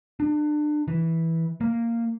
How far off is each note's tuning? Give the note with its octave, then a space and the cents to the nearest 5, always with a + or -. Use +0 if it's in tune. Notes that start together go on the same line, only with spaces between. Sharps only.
D4 +30
E3 -10
A#3 -10